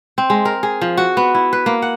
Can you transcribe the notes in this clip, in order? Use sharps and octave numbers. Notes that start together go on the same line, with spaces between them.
C4
G#3
A#4
G#4
F3
F#4
B3
E4
B4
A#3
F#5